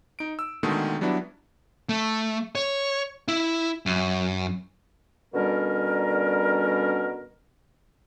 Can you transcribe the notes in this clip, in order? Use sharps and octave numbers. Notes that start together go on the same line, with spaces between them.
D#4 D7
E6
B2 D3 D#3 G#3 A3
F#3 G3 B3 D4 E4
A3
C#5
E4
F#2
B2 D3 G3 C#4 A#4